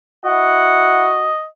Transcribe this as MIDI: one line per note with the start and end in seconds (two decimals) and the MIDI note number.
0.25 1.10 64
0.25 1.29 66
0.25 1.45 75
0.25 1.10 78